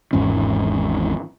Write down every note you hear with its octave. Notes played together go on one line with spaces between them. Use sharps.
G#1 E2 G#2 C#4